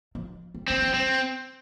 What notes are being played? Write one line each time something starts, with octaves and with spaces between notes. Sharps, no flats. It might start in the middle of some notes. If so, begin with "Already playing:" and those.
F3
G3
E3 C4
F3
G3 C4